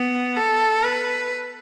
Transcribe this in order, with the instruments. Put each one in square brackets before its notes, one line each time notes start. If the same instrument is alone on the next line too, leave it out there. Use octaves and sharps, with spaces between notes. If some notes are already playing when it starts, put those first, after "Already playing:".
Already playing: [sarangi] B3
A4
B4